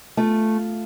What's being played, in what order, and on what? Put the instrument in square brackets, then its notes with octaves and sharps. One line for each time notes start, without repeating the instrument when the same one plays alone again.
[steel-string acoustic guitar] A3 F4